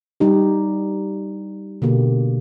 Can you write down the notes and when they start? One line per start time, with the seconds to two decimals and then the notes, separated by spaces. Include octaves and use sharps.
0.20 G3 D#4 G4
1.82 B2 D3 A#3 G4